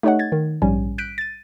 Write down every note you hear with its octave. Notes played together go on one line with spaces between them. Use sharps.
A3 D#4 G4 C#5 D#5 F#5
G#6 A6
D#3
A#1 G#2 G3 C#4 G#5
F#6 G6 B6 D7 D#7
A6 D#7